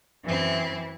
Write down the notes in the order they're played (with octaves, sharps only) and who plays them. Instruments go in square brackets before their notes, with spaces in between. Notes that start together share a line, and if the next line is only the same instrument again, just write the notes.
[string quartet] F#2 C4 [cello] E3 E4